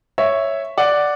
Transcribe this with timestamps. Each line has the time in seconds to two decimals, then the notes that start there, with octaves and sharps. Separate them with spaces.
0.18 C#5 E5
0.78 D5 F#5